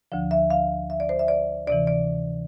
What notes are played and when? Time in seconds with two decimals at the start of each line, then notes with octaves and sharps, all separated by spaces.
0.12 D2 D3 F3
0.31 E5
0.50 F5
0.90 E5
1.00 D5
1.09 C5
1.19 E5
1.28 D5
1.67 D2 C3 E3 D5
1.87 D5